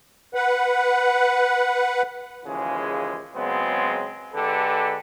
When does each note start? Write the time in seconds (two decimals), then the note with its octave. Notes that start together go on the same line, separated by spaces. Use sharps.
0.34 B4 F#5
2.45 D#2 C#3 E3 F3 G#3
3.34 C#3 F#3 G#3 B3 C4
4.33 D3 G#3 G4 A4 B4